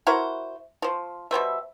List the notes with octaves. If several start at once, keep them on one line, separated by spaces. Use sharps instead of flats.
E4 F#4 A#4 C5
F3 C5
B2 G3 C5 E5